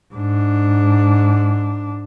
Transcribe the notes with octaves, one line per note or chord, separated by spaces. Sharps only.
G#2 D4